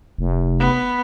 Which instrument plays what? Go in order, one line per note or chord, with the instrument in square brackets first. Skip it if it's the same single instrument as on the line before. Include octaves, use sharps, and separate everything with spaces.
[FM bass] F1
[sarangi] B3